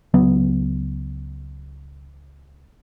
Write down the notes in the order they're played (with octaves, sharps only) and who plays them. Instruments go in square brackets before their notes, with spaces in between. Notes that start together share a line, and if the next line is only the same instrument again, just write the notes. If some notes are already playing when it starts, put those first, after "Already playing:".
[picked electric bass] C#2 F#3 B3